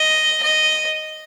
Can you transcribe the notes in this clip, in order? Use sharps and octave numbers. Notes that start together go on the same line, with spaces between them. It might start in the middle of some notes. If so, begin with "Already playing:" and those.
Already playing: D#5
D#5